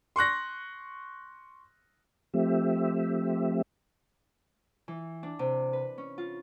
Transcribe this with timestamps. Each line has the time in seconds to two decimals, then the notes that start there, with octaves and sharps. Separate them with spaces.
0.16 C6 C#6 F#6 A#6
2.34 F3 A3 C4 G4 E5
4.88 E3
5.23 D4
5.39 C3
5.73 B4
5.98 C#4
6.18 F4